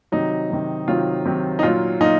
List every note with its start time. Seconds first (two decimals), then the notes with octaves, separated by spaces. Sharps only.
0.12 C3 D#3 F#3 D#4
0.50 C3 D#3 F#3
0.88 C3 D#3 F#3 F4
1.25 C3 D#3 F#3
1.59 D#4
1.63 A#2 F#3 F4
2.00 A#2 F#3 D#4